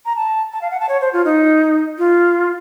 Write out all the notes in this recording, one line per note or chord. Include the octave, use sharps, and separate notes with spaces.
A#5
A5
A5
F5
F#5
A5
C#5
C5
F4
D#4
F4